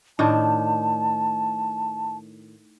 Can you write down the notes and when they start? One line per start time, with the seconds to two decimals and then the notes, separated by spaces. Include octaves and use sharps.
0.19 A2 D#3 D4 A5